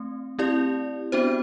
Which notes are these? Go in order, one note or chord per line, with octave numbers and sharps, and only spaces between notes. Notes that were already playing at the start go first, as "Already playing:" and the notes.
Already playing: A3 C4
C4 E4 G4 D5
B3 D4 F#4 C5